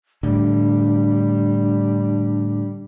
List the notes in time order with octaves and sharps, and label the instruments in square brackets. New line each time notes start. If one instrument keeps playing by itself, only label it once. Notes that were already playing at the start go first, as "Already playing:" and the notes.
[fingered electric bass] A2 D3 [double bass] G3 [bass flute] D4